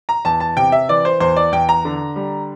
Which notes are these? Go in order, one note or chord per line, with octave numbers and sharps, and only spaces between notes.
A#5
E2 A5
A5
C3 G5
E5
E3 D5
C5
E2 C5
D5
E2 G5
A#5
D3
G3